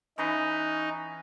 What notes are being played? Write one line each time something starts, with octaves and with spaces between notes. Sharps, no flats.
E3 C#4 D#4 B4